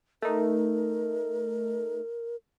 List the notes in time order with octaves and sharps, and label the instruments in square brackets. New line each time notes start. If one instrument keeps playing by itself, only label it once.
[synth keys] A3 D#4 [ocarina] A#4